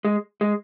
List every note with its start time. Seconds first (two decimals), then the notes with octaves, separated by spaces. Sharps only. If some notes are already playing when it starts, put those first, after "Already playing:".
0.05 G#3
0.41 G#3